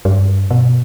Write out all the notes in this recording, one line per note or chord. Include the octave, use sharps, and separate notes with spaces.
G2
B2